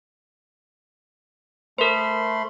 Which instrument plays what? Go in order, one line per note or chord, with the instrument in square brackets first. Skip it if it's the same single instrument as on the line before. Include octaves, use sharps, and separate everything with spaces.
[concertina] A3 B5 C6 [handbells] A#4 C5